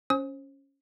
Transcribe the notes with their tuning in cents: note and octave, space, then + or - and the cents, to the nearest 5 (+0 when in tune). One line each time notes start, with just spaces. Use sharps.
C#4 +0 C5 +35 D#6 +35